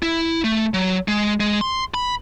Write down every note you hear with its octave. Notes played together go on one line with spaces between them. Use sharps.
E4
A3
F#3
G#3
G#3
C6
B5